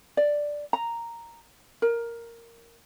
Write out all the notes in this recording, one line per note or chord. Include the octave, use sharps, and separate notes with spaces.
D5
A#5
A#4